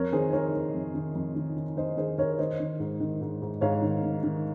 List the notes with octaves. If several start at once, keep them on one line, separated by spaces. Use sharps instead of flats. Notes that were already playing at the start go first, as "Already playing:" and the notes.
Already playing: F2 A#4 C#5
D#3 G#4 C5
D#3 A#4 C#5
D#3
F2
D#3
F2
D#3
D#3
D#3 C5 D#5
D#3 G#4 C5
D#3 A#4 C#5
D#3 C5 D#5
D#3
G#2
D#3
G#2
G#2
G#2 C#5 F5
D#3
D#3
D#3